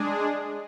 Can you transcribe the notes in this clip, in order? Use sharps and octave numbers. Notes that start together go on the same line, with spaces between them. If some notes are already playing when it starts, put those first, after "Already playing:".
Already playing: G#3 D4 G#4